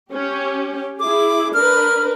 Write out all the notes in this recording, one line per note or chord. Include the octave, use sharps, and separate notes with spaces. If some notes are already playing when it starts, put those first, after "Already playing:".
C#4 G4
E4 G#4 D6
D4 A#4 B4 F6